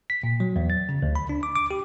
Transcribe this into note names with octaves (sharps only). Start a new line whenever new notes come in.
B6
A#2
F#3
E2
A6
C#3
D2
B5
D4
D6
D6
G4